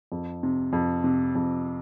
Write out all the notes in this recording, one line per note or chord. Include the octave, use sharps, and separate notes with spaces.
F2
C3
F2
C3
F2